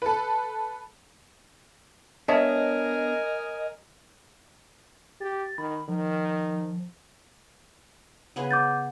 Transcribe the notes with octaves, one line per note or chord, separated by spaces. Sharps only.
A4 B4
B3 D4 A#4 C#5 D#5 E5 G#5 A5
G4 A6
D#3 B5
D#3 F3
C#3 B3 G#4
D6 G6 A6